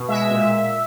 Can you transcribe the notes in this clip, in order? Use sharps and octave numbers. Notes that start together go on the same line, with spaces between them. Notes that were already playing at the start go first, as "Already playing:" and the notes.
Already playing: B2
G#3 E5
A#2